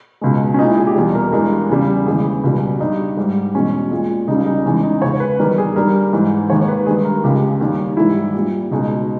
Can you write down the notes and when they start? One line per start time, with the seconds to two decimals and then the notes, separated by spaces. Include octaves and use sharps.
0.21 C#2 B2 G#3
0.54 C#4
0.59 A#2 G#3 D#4
0.68 E4
0.77 G#4
0.87 G4
0.96 E2 B2 G3
1.15 A#4
1.33 G2 E3 G#3 A#4
1.69 E2 C#3 G3
2.06 D#2 C#3 E3 G#3 G#4
2.43 C#2 B2 G3
2.80 G2 G3 D#4
3.17 G#2 G3
3.54 E2 B2 G#3 C#4
3.91 A#2 G#3
4.28 C#2 C#3 G3 D#4
4.46 D#4
4.66 E2 C#3 E3 G#3 C#4
4.83 D#4
5.02 C#2 C#3 G#3 C#5
5.20 B4
5.39 E2 D#3 G3 A#4
5.58 G#4
5.76 G2 G3 A#4
6.13 G#2 E3 G#3
6.49 D#2 D#3 G#3 C#5
6.68 B4
6.86 G2 D#3 G#3 G#4
7.05 A#4
7.24 C#2 C#3 G#3 G4
7.61 D#2 D#3 G3
7.97 G#2 E3 G3 E4
8.34 A#2 G3
8.71 C#2 B2 G#3 D#4